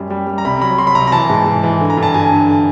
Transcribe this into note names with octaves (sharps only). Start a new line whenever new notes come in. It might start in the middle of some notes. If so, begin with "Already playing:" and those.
Already playing: F#2 G3
G3
G3
A#5
C2 B5
F#3 B5
F#3 C6
B5
C2 A#5
A#5
E3 A5
G#2
G#2
E3
D3
A#5
G2
A5
G2 G#5
D3